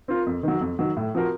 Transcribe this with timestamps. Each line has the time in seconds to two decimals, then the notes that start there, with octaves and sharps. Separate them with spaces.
0.08 C4 F4 A#4
0.26 F2
0.43 D#3 F#3
0.61 F2
0.79 D#3 F#3
0.97 A2
1.15 F3 C4 F#4 A#4